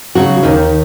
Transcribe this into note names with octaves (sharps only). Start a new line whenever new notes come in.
C#3 F#3 F#4
D#2 D#3 D#4